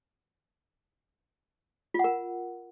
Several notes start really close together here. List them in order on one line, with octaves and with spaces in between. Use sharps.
F4 F#5 A#4